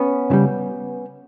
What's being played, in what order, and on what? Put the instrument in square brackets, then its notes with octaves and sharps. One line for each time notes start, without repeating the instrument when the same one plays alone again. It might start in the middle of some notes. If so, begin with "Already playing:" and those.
Already playing: [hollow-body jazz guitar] B3 C#4
C#3 E3 G3